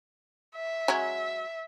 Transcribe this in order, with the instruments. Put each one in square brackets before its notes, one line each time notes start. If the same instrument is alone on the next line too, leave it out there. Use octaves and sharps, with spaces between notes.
[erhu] E5
[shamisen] F#3 G#3 C#4